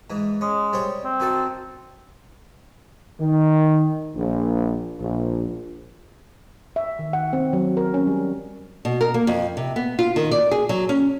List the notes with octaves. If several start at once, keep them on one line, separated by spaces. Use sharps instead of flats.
G#2 E3
G#3 C#4
G3 C4 C#5
C4
D#3 F#4 A4
D#3
A#1
A#1
E5
D#3
F#5
C4
F#3
A#4
C#4
G3
B2
A#4
A#3
F2
C3
B3
F4
D#3
D5
G#4
F#3
C#4